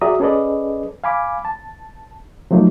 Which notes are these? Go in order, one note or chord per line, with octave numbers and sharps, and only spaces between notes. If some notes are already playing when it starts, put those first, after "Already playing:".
F#4 G#4 D5 E5 A#5 D#6
C#4 G#4 A4 B4 D5 D#5
F5 G#5 B5 D6
A5
F3 F#3 A3 A#3 D#4